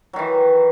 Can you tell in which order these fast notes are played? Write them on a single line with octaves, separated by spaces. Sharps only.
F#3 D#3 E3